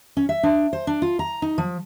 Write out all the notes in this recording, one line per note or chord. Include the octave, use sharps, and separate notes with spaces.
C#4
E5
D4
C5
D4
F4
A#5
D#4
F3